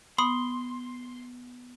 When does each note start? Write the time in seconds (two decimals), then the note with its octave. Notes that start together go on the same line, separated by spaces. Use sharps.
0.18 B3 B5 C6 D#6